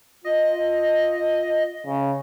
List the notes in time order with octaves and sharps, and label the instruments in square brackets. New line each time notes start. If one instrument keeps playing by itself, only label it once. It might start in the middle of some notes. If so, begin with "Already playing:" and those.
[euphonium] F4 [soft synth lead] D#5
[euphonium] C#3